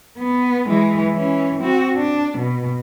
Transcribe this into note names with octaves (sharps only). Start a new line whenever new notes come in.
B3
E3 G#3
E3 C#4
C4 F#4
D4
B2